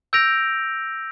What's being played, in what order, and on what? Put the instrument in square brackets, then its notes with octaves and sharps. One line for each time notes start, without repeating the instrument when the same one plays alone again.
[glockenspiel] E6 G6 A#6 D7 F7